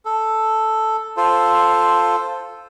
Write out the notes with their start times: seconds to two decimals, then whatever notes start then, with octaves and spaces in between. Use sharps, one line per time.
0.05 A4
1.17 F4 A4 C5